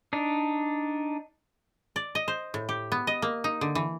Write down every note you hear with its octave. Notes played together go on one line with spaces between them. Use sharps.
D4 D#4
D5
D#5
C5
A2
G4
B3
D#5
A#3
D#4
D3
E3